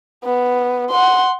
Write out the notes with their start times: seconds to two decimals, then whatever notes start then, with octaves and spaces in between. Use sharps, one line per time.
0.24 B3
0.91 F#5 C6